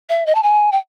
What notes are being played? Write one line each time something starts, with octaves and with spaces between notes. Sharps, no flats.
E5
D#5
A5
G#5
G5